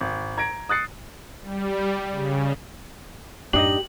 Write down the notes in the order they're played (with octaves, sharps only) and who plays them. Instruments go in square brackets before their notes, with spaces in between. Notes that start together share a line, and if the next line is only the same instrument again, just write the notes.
[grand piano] G#1
A#5 G#6 A#6 D7
D#6 F#6 A6 C7 C#7
[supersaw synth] G3
C#3
[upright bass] F#2 A2 [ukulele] D4 D#4 D#5 [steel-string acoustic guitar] G4 [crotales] F#7